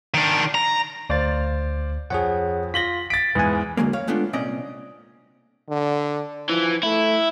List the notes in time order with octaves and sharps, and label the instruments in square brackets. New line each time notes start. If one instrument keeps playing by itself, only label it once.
[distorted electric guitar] D#3 D4
A#5
[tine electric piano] D2 A6 [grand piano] C5 D5 F5
[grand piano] F2 [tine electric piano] G#4 C#5 F#5
[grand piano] F4 F#7 G7 [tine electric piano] A#6 B6
[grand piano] A6 D7 [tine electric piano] B6
[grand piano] E2 G#2 [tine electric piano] B4 G#5
[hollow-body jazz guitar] D3 F#3 G#3 A#3
C#5 F5
G#3 A3 B3 D4 F4
C2 A#2 C4 C#4 D5 D#5
[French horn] D3
[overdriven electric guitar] E3 [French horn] F3
[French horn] A3 [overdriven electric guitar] E4